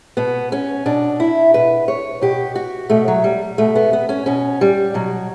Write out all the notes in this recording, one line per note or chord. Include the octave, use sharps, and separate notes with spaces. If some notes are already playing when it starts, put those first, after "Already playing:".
B2 B3
C#4
B2 D4
E4
B2 B4
C#5
B2 G4
F#4
B2 A3
F#3
G3
B2 A3
B3
B3
C#4
B2 C#4
G3
B2 F#3